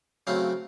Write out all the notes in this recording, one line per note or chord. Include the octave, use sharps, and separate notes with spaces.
C#3 F#3 A3 C4 F5